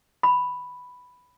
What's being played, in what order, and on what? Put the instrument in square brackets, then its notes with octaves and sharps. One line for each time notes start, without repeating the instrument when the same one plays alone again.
[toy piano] B5